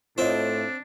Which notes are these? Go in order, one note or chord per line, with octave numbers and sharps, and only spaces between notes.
A2 C4 D4 F4 C#5 D#5